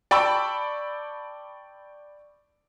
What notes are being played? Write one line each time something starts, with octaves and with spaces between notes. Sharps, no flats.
D5 G5 A5 B5 C#6 E6